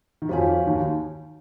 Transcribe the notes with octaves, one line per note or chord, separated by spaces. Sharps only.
D#3
F2 F3 F#4 C#5 F5 G#5
D#2 D#3